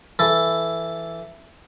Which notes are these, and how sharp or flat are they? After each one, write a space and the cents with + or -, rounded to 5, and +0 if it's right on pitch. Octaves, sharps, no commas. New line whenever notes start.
E3 +10 A4 +0